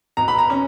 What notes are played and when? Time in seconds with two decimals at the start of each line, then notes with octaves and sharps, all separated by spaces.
0.17 B2 A#5
0.28 B5
0.39 A#5
0.50 C#4